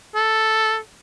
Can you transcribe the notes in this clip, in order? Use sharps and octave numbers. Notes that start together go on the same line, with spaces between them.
A4